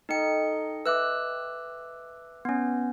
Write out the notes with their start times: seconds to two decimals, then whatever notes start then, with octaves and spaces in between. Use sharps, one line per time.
0.09 D#4 A4 D#5 G5 C#7
0.86 B4 E5 D6 E6 F#6
2.45 B3 C#4